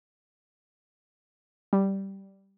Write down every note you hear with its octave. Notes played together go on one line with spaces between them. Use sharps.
G3